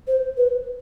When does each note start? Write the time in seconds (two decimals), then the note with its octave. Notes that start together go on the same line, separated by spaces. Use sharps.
0.08 C5
0.37 B4